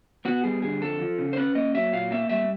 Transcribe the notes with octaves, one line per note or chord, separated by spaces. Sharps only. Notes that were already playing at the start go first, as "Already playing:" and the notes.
B3 F#4
G3 G#4
D3 G#4
F2 A4
F3
C#3
C5
C#4 B4
A#3 D#5
F#3 E5
A#2 F5
A#3 E5
G3 E5